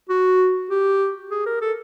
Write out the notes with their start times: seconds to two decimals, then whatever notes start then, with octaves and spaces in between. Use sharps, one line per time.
0.09 F#4
0.70 G4
1.31 G#4
1.46 A#4
1.62 A4